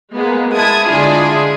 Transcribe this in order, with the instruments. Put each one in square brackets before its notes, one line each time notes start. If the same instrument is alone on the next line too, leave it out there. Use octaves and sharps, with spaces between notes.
[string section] G#3 A#3 B3
G#3 E4 A5 D#6 G#6
D3 G#3 D4 E4 F4 G#4